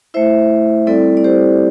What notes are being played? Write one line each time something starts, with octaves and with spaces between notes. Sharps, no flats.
A3 E4 C5 E5
G3 C4 E4 A4 D5
D5
G4 C5